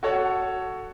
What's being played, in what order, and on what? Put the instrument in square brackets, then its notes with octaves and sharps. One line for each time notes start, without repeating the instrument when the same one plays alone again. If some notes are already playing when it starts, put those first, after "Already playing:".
[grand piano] F#4 A4 C#5 F#5